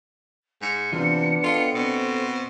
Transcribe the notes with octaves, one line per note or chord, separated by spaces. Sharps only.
G#2 C#7
C3 E3 B3 D4 F4
F4 A4 D#5 G5
B2 C4